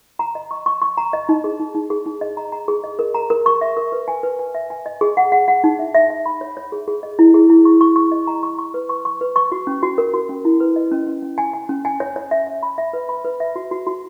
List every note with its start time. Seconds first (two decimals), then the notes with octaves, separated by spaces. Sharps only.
0.19 A#5
0.35 D#5
0.51 C#6
0.66 C#6
0.82 C#6
0.97 A#5
1.13 D#5
1.29 D#4
1.44 G#4
1.60 D#4
1.75 D#4
1.90 G#4
2.06 D#4
2.21 D#5
2.37 A#5
2.52 A#5
2.68 G#4
2.84 D#5
2.99 A#4
3.14 A#5
3.30 A#4
3.46 C#6
3.61 E5
3.77 A#4
3.92 B4
4.08 G#5
4.23 B4
4.39 G#5
4.55 E5
4.70 G#5
4.86 D#5
5.01 G#4
5.17 F#5
5.32 F#5
5.48 F#5
5.64 D#4
5.79 E5
5.94 E5
6.10 E5
6.26 B5
6.41 C#5
6.57 C#5
6.72 G#4
6.88 G#4
7.03 D#5
7.19 E4
7.34 G#4
7.50 E4
7.65 C#6
7.81 C#6
7.96 C#6
8.12 D#5
8.27 A#5
8.43 C#6
8.59 C#6
8.74 B4
8.89 C#6
9.05 C#6
9.21 B4
9.36 C#6
9.52 F#4
9.67 C#4
9.83 F#4
9.98 A#4
10.14 F#4
10.29 C#4
10.45 E4
10.60 B4
10.76 D#5
10.92 C#4
11.07 C#4
11.23 C#4
11.38 G#5
11.53 G#5
11.69 C#4
11.85 G#5
12.00 C#5
12.16 C#5
12.31 E5
12.47 E5
12.63 B5
12.78 E5
12.93 B4
13.09 B5
13.25 B4
13.40 E5
13.56 F#4
13.71 F#4
13.87 F#4